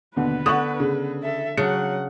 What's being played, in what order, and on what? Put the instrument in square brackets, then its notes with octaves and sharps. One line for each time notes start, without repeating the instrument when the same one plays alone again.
[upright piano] D#2 B2 D3 [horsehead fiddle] B3 B4
[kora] D3 [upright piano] F#5 C#6 D#6
[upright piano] C#3
[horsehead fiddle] A4 E5
[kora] C#3 D4 [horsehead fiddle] F#3 F#5 [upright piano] C#7